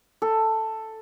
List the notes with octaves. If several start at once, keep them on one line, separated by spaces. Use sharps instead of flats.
A4